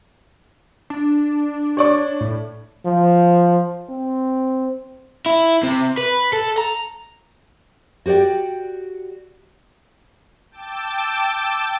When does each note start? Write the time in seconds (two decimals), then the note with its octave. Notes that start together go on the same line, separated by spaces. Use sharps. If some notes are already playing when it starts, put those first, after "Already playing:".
0.90 D4
1.77 C#5 D5 C#6
2.21 A2
2.85 F3
3.89 C4
5.26 E4
5.64 C3
5.98 B4
6.33 A4
6.58 A#5
8.06 F#4 G4 C5 D5 G5
10.51 G5 A5 D6 E6 A6